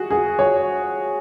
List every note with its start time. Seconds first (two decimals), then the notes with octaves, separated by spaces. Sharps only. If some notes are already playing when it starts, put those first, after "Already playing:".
Already playing: F#4 G#4
0.11 G#4
0.39 C#5